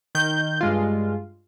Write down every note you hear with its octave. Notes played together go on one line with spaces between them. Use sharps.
D#3 G6
G2 G#3 F4